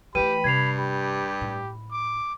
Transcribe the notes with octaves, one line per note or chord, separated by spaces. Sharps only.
E3 A3 G4 B4 G5 B5 D#7
G2 C3 G#6 C7 F7
G4 B5
A2
D6